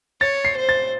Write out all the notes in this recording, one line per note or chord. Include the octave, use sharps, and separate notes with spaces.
C#5 A6
C7
C5
A6